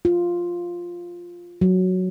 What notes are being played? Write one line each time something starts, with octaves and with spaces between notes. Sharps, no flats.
F4
F#3